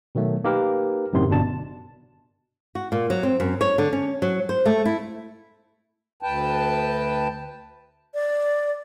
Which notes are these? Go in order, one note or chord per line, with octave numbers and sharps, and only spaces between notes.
B2 D#3 F#3 A3
A#3 D#4 G4 A#4 B4
F#2 A2 C3 D#3 C6
G1 B2 D4 A5
F#4
A#2
F#3
C4
F#2
C#5
D3
C#4
F#3
C5
A3
E4
D2 B4 G5 A5
D5